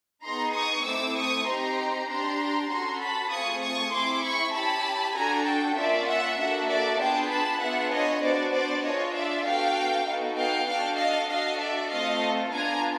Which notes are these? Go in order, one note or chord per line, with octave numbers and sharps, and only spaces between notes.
B3 D#4 G#4 A#5 C6
C#6 D#6
A3 C4 E4 D6 E6
C#6 D#6
C4 D#4 G4 A#5 C6
D4 G4 A#5 C6
C#4 F#4 A4 A#5 C6
A5 B5
A3 C4 F4 G#4 C#6 D#6
C#6 D#6
C4 E4 G#4 C6 D6
B5 C#6
C#4 E4 G4 A5 B5
D4 F#4 A4 G#5 A#5
G5 A5
A#3 C#4 F4 D5 E5
E5 F#5
A#3 D4 F#4 A4 E5 F#5
D5 E5
B3 D4 F4 G#4 G5 A5
A5 B5
B3 D4 F4 G#4 E5 F#5
C#5 D#5
B3 D4 F#4 C5 D5
C5 D5
D4 F4 G#4 C#5 D#5
D5 E5
B3 D4 F#4 A4 F5 G5
B3 D#4 F#4 A4
F5 G5
D4 F#4 A4 F5 G5
D#5 F5
D4 F#4 A4 D#5 F5
D5 E5
A3 C4 F4 A4 D#5 F5
B3 D4 F4 G#5 A#5